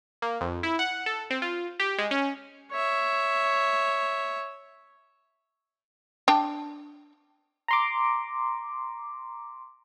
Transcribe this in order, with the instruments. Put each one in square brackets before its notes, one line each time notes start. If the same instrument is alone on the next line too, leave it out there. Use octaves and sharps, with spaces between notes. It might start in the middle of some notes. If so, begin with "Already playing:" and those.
[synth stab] A#3
F2
E4
F#5
A4
C4
F4
G4
G#3
C#4
[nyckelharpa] C#5 E5
[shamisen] D4 G5
[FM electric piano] A#5 C6 D6